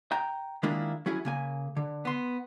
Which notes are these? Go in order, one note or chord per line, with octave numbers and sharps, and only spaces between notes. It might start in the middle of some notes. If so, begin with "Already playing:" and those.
G5 A#5
D#3 G#3 A#3 D4 E4 F4
F#3 C#4 E4 G#4
C#3 A#3 G#5
D3
B3 C6